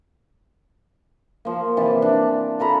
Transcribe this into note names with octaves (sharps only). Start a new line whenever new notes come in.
F3 A#3
C3 E3 D5
D4
F4 A4 A#5 B5